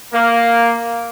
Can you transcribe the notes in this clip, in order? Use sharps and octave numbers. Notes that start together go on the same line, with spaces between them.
A#3